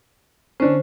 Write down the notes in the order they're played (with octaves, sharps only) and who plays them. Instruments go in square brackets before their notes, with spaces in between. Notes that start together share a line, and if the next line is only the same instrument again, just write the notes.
[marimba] D3 C5 [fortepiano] C#4 D4